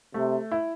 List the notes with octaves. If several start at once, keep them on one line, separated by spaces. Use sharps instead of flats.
C3 A3
E4